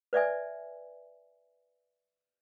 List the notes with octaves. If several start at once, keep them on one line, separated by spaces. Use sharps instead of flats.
B4 D5 E5 G#5